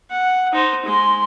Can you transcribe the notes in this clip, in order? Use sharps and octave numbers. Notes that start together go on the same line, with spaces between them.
F#5
D#4 C5
G#3 C6